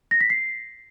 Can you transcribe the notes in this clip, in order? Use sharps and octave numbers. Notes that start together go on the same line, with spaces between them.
A#6
B6
C7